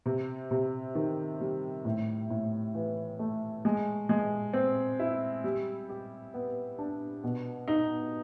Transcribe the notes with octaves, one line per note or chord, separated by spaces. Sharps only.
C3
C3
D#3
G3
A2
A2
E3
A3
G#3
G#3
C4
E4
G3
G4
B3
D4
B2
D#4